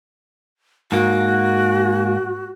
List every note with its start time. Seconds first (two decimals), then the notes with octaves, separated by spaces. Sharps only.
0.92 G#2 A#3 F#4